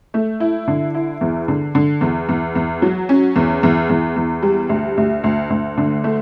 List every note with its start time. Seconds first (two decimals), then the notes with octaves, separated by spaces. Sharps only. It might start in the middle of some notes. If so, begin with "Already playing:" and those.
0.14 A3
0.40 E4
0.68 D3
0.95 E4
1.21 E2
1.48 D3
1.75 D3
2.01 E2
2.29 E2
2.55 E2
2.82 F#3
3.09 C#4
3.36 E2
3.63 E2
3.90 E2
4.16 E2
4.43 G3
4.69 D2
4.97 D2
5.24 D2
5.50 D2
5.78 D3
6.04 A3